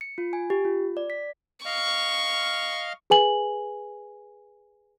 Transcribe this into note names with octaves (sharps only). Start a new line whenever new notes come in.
C#7
F4
G#5
G4
F4
D5
B6
D#5 F5 C#6 F6
G#4 B4 G#5 F#7